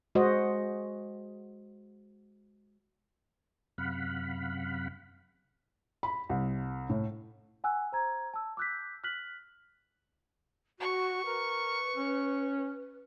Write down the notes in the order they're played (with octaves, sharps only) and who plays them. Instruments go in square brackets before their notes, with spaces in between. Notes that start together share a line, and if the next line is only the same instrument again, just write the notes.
[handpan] G#3 F#4 C5 D#5
[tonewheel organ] F#2 C3 F5 F#5 B5
[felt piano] B5
C2
A2
[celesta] F#5 G#5 E6 F#6
C5 A#5 G#6
A5 E6
D6 E6 F#6 G6 B6
F6 F#6 B6 F#7
[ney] F#4 [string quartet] C#6
[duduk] A#4 [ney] B4
[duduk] C#4